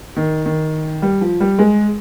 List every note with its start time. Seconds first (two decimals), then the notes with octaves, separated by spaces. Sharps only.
0.16 D#3
0.45 D#3
1.02 G3
1.21 F3
1.41 G3
1.59 G#3